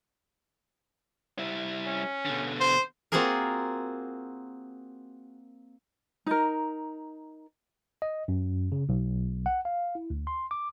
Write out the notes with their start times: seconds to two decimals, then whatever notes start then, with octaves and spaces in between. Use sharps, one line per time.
1.39 G3 E4
1.87 C#4
2.26 B2 D3
2.60 C5
3.12 A#3 C4 F4 F#4 G#4 A#4
6.26 D#4 A#4
8.02 D#5
8.28 F#2
8.72 C#3
8.89 B1
9.46 F#5
9.65 F5
9.95 E4
10.10 D2
10.27 C6
10.51 D6